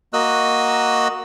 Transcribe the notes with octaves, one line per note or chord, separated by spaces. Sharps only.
A#3 F#4 D#5 E6 F#6